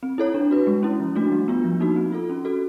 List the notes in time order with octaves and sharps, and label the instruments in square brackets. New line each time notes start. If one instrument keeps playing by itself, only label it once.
[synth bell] C4
E4 A4 C#5
D4
F#4 B4
G#3
C#4 E4
F3
A3 D4 F#4
G3
B3 D4 F4
F3
A#3 D#4 F#4
C4
F4 A4
C#4
F#4 A4